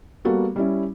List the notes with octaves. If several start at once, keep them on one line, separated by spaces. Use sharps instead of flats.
G3 A#3 B3 F#4 A4
G3 C#4 E4